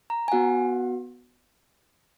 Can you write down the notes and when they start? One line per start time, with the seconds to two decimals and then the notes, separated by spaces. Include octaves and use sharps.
0.10 A#5
0.28 G#5
0.32 B3 F#4 F#5